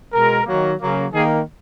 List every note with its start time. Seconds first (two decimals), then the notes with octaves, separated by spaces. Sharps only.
0.13 B2 G#3 A#4
0.46 D#3 F#3 A#3
0.79 C#3 F#3 A#3
1.13 D#3 A#3 G#4